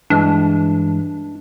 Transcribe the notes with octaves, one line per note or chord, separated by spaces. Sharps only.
G2 E3 G#3 D4